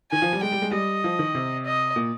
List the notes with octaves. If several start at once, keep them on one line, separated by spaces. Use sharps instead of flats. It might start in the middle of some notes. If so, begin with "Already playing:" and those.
D#3 G#5
F3
G3
G#3 G5
G3
G#3
G3 D#5
F3
D#3
C3
D#5
A#2